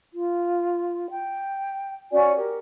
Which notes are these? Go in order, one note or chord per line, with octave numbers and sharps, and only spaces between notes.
F4
G5
C#4 F#4 D5 G#5
G4 A#4